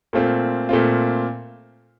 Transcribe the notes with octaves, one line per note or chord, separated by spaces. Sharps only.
A#2 A3 C4 F4
A#2 A3 C4 F4